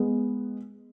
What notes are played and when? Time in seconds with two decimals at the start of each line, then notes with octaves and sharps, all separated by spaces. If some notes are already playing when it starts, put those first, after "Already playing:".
Already playing: G#3 B3